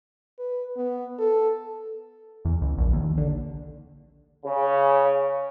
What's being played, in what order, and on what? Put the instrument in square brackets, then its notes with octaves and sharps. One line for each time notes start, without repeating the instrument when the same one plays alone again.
[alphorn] B4
B3
A4
[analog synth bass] E2
C#2
A#1
D#2
D3
[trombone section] C#3